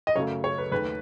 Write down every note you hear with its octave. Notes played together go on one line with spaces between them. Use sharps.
D#5
F#2 C#3 F#3 A3 C#5
C#5
B4
D#2 D#3 A3 B4